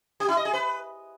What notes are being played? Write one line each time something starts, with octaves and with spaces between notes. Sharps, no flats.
G4
E4
D#5
G#4
B4